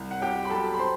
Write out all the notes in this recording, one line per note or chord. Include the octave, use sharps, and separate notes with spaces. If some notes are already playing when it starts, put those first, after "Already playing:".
Already playing: C2
F#5
C2 G4 G5
B5
F#3 A4 A5
B5
C5 C6